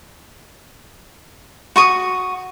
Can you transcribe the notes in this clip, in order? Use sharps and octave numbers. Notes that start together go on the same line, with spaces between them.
F#4 C#6 D#6